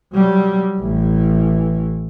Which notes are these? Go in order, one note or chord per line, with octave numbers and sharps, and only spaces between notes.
F#3 G3
A1 E3